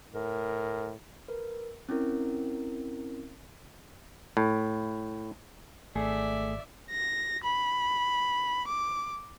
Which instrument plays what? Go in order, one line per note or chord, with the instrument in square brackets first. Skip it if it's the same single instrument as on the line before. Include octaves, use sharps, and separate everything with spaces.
[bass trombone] A2 [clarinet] A#4
[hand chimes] A#4 B4
C4 C#4 E4 A#4
[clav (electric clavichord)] A2
[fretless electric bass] G#1 [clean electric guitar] A3 G#4 [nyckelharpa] D5 E5
[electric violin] A#6
B5
D6